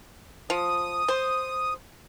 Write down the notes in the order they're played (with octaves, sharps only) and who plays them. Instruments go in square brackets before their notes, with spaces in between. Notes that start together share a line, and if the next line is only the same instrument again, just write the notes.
[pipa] F3 [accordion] D#6
[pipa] C5